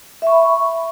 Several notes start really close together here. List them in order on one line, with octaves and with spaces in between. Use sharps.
E5 C#6 B5